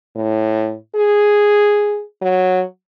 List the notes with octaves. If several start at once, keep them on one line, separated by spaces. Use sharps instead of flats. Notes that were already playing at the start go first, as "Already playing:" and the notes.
A2
G#4
F#3